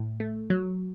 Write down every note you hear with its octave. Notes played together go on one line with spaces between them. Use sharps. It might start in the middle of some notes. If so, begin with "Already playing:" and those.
Already playing: A2
A3
F#3